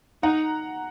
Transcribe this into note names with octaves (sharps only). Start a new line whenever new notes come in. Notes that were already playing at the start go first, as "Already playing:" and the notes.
D#4 F#5 A#5